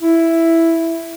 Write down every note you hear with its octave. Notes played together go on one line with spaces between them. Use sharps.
E4